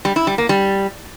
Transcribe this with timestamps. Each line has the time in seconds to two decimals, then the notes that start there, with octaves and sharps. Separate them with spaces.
0.05 G3
0.16 E4
0.27 G3
0.38 A#3
0.49 G3